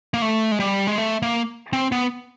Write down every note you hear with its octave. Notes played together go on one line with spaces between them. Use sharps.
A#3
A3
G#3
G3
G#3
A3
A#3
C4
B3